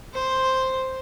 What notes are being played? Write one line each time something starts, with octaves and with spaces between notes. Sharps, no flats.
C5